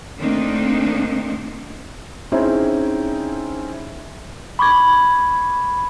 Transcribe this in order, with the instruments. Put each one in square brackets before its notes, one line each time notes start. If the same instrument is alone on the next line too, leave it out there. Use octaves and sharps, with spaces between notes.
[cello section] D#3 A3 A#3 C4 D4 D#4
[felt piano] C4 C#4 D#4 E4 G#4
[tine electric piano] B5 C#6 D6 G#6